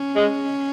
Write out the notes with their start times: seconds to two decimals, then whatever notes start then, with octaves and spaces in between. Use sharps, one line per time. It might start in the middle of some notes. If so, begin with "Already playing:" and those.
Already playing: C#4
0.16 G#3